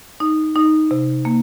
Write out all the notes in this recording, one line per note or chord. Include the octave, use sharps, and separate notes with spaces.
D#4
D#4
C3
A#3